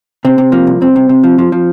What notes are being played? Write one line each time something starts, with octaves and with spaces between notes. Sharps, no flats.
C3 C4
C3
F3 A#3
C2
C2 C4
C3
C3
F3
F3
F3